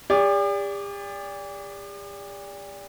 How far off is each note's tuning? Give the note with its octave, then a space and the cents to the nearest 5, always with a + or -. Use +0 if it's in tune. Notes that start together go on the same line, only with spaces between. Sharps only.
G4 +45 D5 -25